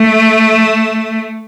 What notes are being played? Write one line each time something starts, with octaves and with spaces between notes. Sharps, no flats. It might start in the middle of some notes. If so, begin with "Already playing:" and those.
Already playing: A3